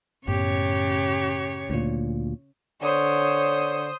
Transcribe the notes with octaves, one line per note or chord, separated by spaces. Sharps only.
F#2 A2 C#3 B3 G4 C#5
D2 A#2
D3 C5 C#5 D#6